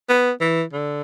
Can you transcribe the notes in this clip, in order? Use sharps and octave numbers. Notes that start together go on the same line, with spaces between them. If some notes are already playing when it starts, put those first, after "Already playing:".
B3
E3
D3